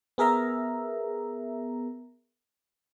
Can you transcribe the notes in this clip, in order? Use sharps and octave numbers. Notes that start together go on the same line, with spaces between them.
B3 G#4 A#4 E5 A#5